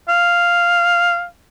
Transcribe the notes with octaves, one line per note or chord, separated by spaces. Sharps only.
F5